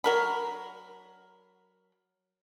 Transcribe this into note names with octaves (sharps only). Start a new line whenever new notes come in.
F#3 A#4 B5